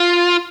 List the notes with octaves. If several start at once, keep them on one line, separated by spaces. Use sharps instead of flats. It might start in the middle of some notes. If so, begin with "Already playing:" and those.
Already playing: F4